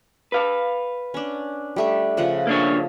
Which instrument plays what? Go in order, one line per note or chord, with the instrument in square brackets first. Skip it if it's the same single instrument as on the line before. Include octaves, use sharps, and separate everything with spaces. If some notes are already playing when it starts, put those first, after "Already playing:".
[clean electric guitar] B4 F5
[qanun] C#4 D4
G3 A3 D4
C#3 F3 F#5
[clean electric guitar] A#3 D4 C#5